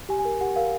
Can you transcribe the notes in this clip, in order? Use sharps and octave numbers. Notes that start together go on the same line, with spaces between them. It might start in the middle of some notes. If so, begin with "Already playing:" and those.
G4 G#5
G#5
A#4
G4 F#5
A#4 F5